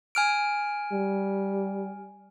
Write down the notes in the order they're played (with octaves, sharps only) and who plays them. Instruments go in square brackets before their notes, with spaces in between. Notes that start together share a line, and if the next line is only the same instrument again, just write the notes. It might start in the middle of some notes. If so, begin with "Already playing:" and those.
[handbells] G#5 F6 D7
[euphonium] G3